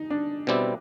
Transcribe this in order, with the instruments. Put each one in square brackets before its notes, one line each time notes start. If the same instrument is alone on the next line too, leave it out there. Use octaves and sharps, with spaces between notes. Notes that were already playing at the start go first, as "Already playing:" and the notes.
Already playing: [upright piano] D#4
D4
[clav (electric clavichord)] B2 G3 C4 E4 G4